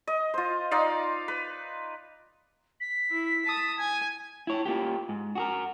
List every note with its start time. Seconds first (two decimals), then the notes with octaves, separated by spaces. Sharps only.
0.07 D#5
0.34 F4 C5
0.71 D#4 D5 F5
1.28 B4
2.81 B6
3.11 E4
3.45 A5 D#6
3.78 G#5 G#6
4.47 E4 C#5
4.66 A#3 F4 G4
5.09 G#2
5.35 F#4 G#4 A#4